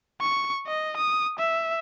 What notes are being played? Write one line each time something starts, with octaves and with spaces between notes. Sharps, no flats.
C#6
D#5
D#6
E5